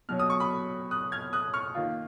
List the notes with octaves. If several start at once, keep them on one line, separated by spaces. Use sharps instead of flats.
B2 F#3 C#4 F6
D#6
C#6
B5 D#6
D#6 F#6
F6 G#6
D#6 F#6
C#6 F6
D#3 A#3 F4